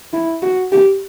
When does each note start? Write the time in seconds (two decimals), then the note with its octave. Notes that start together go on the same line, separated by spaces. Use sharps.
0.13 E4
0.42 F#4
0.72 G4